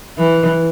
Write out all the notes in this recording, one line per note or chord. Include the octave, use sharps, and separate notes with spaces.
E3